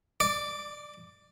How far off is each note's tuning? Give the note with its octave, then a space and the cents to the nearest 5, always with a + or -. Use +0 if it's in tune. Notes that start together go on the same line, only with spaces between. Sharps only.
D5 +15 D6 -10